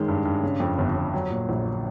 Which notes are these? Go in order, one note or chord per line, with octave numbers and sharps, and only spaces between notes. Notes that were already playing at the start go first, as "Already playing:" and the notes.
Already playing: F#2 D#3 G#3
G2
G2
C#3
F2
G1
G1
F#3
A#2
A#1